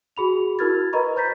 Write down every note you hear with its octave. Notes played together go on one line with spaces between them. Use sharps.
F#4 G#4 B5 F7
E4 F#4 A#4 F6 G#6 A6
A#4 B4 D#5 A#5 B5 C#6
C5 A#5 G6 A6 B6